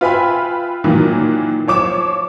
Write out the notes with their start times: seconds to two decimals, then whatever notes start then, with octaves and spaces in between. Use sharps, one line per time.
0.01 F4 B4 E5 G5 G#5 B5
0.84 A#2 D#3 E3 F#3
1.67 F3 C#5 D6 E7